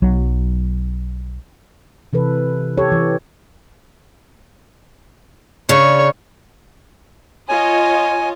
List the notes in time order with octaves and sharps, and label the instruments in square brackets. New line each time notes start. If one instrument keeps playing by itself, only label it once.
[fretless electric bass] B1 F#3
[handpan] C3 E3 A4 B4
G4 A4 C#5
E3
[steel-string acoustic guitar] C#3 D4 [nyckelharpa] C#5
[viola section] F4 C#5 D#5 [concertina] G#5